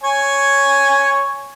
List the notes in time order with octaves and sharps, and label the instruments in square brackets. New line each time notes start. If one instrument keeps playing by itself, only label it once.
[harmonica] C#5 G#5